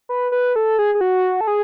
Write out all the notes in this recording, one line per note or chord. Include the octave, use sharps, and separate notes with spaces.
B4
B4
A4
G#4
G#4
F#4
A4
G#4